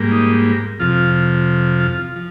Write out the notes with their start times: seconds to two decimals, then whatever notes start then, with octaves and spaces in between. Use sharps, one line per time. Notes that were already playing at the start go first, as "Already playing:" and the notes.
Already playing: G#2 G3 A#3
0.11 D#4
0.80 F2 C3 F3 F4
1.80 F4
2.16 F3